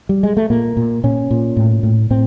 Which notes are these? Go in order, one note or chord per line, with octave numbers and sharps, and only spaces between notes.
G3
G#3
A3
A#2 A#3
A#2
A#2 C#4
A#2
A2
A2
A2 C4